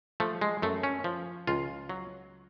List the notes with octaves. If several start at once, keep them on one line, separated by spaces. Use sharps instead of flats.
F3 A3
G#3
F#2 A3
C#4
F3
C#2 F4
F#3